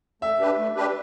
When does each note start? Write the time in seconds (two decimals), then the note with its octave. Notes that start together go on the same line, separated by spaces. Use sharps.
0.22 A3 E5
0.39 D4 G4 B4
0.58 A3
0.76 D4 G4 B4